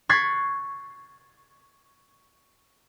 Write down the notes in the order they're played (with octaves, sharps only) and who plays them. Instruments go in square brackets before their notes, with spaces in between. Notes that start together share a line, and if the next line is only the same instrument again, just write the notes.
[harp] C#6 F#6 G#6 A6 B6 C7